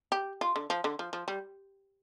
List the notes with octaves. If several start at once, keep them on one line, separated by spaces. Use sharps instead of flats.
G4
F4
D3
F3
D3
F3
F3
G3